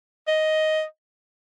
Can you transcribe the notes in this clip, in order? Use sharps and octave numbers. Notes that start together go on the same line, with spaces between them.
D#5